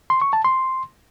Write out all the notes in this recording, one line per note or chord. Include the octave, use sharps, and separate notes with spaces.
C6
C#6
A5
C6